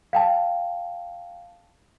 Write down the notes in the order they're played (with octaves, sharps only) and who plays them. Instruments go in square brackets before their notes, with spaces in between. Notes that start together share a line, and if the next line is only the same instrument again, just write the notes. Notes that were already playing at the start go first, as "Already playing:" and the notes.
[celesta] F5 G5 A5